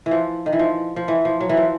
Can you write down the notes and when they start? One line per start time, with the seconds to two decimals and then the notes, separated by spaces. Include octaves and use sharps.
0.06 E3
0.11 F3
0.46 D#3
0.53 E3
0.59 F3
0.96 F3
1.08 E3
1.25 F3
1.41 F#3
1.49 E3
1.57 F3